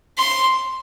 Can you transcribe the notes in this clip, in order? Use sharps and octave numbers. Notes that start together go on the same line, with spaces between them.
C6